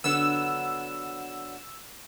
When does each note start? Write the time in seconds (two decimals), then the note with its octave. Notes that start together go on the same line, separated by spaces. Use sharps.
0.04 D3 F#3 B3 E6